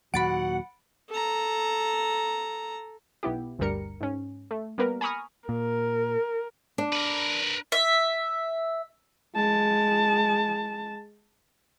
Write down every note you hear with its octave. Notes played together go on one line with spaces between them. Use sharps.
D#2 A#2 F#3 F#4 F#5 B5 A6 D7
A4 A#5
B1 B3 E4 G4
G1 D2 G2 G3 A#4 C#7
G#2 C#4
A3
G3 A#3 B3 A#4 B4
G#5 A#5 B5 C#6 D#6 F6
A#2 A#4
D4
A#4 B4
E5
G#3 A5